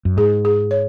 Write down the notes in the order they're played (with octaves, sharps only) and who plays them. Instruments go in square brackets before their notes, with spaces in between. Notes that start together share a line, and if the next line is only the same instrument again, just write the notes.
[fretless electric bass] F#2
[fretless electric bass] G#2 [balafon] G#4
[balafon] G#4
C#5